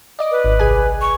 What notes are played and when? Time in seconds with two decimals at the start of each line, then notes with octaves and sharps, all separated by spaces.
0.19 D5 D#5 D6
0.31 B4
0.44 G#1
0.59 C2 G#4 G#5
1.01 C#6